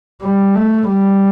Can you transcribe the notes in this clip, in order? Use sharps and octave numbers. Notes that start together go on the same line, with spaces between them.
G3
A3
G3